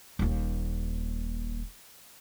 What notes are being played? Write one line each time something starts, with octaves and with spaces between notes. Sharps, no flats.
D#1 D#2